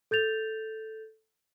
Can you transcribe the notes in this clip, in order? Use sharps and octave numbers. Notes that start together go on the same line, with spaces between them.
A4 G6 A6 F7